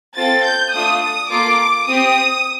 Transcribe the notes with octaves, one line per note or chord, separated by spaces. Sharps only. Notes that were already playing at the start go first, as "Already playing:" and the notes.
C4 F4 A4 A6
G6
A3 D4 F4 D#6
D#6
A#3 F4 A4 D6
C4 G4 D#6